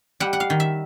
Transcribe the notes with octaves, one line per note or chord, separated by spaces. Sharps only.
G3 F#5
F#5
F5
D#3
E5